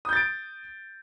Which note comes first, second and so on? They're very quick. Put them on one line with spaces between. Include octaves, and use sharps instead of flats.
D#6 G6 A6 D7